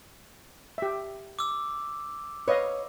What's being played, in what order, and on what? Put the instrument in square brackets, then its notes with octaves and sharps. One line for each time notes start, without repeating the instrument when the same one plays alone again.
[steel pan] G4 E5
[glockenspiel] D6 E6
[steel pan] B4 D#5 F5 [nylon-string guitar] C#5